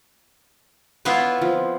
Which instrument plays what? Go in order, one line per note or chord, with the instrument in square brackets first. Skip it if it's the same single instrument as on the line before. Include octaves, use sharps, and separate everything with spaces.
[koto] B3 E4 F4 [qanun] B4 C#5
[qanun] F3 C4